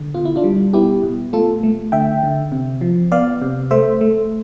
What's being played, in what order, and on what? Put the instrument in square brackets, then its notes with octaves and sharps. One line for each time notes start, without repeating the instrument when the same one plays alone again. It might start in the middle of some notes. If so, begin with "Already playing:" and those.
Already playing: [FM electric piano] D3
B2 F4
E4
D4 F4
G3
B3 E4 G4
B2
A3 F4 A4
A3
D3 E5 G5
D3
C3
F3
B3 D5 F5
C3
A3 C5 E5
A3